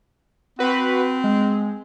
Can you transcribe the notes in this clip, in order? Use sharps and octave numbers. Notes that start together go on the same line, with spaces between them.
C4 F#4 B4
G#3